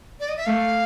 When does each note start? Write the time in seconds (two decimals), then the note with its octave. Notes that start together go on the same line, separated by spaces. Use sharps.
0.20 D5
0.29 D#5
0.37 E5
0.46 A3 F5